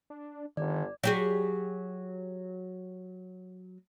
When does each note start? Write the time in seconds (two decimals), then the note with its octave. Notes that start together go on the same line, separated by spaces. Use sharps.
0.10 D4
0.57 G1 D#3 D5
1.04 F#3 G4 G#4